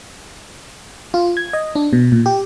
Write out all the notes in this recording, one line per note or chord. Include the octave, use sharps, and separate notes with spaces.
F4
G#6
D#5
D4
B2
A#2
G4